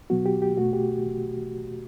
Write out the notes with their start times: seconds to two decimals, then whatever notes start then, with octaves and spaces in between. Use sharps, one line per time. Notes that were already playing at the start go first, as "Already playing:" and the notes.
0.10 B2 F#3 B3 F#4
0.26 G4
0.42 G4
0.58 B2 A3 F#4
0.73 G4